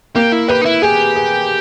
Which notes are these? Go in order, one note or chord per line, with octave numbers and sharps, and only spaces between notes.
A#3 G4
E4
G4 B4
D#4
E4
G4 G#4
G#4